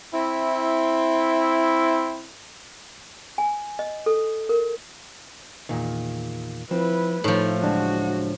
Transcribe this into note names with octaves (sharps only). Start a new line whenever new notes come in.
C4 E4
G#5
D#5
A4
A#4
E2 A#2 D#3
F3 C4 E4 B4
A2 F3 A3 D#4 A4
C#2 F#3 G#3 D4 F#4